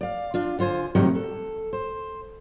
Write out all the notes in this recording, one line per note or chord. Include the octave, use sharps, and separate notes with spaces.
D5 F5
D4 F4
D3 F4 C5 G#5
A2 C3 D#3 F#3 G3
A4
C5